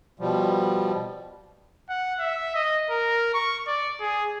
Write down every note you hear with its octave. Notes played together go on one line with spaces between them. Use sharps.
B2 F3 G3
F#5
E5
D#5
A#4
C#6
D5
G#4